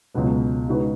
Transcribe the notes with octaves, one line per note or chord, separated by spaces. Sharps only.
C#2 B2 F#3 B3
C#3 G#3 D#4 F#4 B4